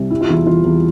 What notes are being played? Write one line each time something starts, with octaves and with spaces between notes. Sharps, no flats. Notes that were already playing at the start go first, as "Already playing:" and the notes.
Already playing: C2
G3 E4
F4
E2 E4
E3 F4
E2